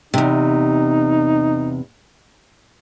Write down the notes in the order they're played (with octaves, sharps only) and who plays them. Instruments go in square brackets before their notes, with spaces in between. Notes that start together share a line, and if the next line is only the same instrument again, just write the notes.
[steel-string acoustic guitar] E2 C3 [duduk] D#4